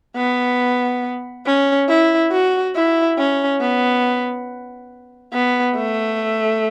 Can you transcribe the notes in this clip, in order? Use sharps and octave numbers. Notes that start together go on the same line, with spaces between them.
B3
C#4
E4
F#4
E4
C#4
B3
B3
A3